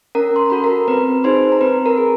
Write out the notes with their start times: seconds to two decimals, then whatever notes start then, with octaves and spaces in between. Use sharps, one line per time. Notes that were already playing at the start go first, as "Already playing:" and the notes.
0.15 C#4 A#4 A#5
0.36 C6
0.50 F#4 A4 B5
0.64 A#4 A#5
0.88 C4 B4 B5
1.24 D#4 G#4 C5 C6
1.52 A#5
1.61 C4 B4 B5
1.86 A#4 A#5
1.98 G#4